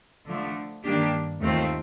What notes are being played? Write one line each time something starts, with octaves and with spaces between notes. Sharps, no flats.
D3 F3 A3
G2 D#3 A#3 D4 G4
D#2 D#3 A3 C4 F4